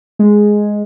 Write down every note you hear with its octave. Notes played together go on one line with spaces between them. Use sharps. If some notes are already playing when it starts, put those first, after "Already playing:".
G#3